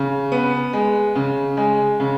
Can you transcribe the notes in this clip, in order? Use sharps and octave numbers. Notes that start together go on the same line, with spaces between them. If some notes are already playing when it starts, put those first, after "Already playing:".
Already playing: C#3
B3
G#3
C#3
G#3
C#3